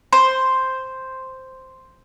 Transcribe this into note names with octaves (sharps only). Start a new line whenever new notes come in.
C5